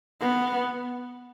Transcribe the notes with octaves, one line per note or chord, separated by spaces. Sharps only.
B3